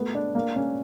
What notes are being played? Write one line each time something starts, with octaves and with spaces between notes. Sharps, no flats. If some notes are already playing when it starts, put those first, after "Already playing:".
Already playing: A3 B3
D4
A#3
C#4